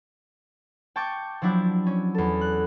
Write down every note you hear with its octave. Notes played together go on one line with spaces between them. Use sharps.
G5 A5 C#6 D6 G6 G#6
F3 F#3 D4 E4
C#4
E2 A4
F#6